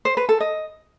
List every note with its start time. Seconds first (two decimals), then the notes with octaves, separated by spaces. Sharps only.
0.05 C5
0.17 B4
0.29 A4
0.40 D#5